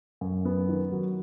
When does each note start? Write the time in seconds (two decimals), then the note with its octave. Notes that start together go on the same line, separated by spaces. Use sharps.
0.21 F#2
0.45 B3
0.69 D#3
0.92 F#3